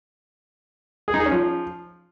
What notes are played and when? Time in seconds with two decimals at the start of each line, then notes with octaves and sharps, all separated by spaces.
1.08 G#4
1.14 D#4
1.20 G#4
1.26 C#4
1.32 F3